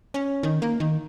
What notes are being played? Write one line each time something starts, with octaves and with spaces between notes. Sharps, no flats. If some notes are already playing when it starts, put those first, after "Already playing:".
C#4
D#3
A#3
D#3